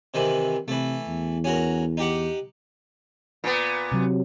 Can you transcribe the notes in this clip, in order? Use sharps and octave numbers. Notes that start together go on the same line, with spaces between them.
C3 D#3 E3
C3 E3 A3
E2
C#4 F#4 A#4
D#4 G4 F#5
A#2 B3
C3 F#3